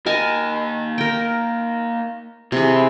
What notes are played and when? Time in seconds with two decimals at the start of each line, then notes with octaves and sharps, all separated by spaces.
0.06 A#3 A#4 D#5 G#5 A5
0.98 A#4 G5
2.52 C3 E3 G#4